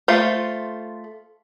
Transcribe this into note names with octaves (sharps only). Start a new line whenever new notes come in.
A3 F4 C5